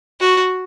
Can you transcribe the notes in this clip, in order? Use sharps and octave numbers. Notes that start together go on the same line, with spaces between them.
F#4